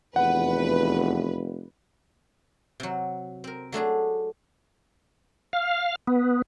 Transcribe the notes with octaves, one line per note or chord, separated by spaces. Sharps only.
F1 E2 B4 F#5
C3 F#3
C4 A#4
F#3 A3 D4 G#4
F5
B3